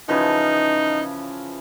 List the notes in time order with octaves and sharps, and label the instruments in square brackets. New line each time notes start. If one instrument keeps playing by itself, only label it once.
[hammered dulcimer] C#3 E3 F3 [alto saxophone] D#4